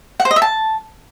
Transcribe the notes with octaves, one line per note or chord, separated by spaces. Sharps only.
F#5
C5
D#5
E5
A5